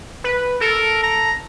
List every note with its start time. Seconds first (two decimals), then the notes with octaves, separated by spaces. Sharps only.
0.24 B4
0.61 A4 A#4
1.03 A#5